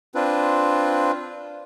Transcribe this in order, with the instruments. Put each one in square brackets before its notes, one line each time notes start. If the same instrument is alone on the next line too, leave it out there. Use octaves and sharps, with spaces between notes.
[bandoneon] C4 D4 F4 B4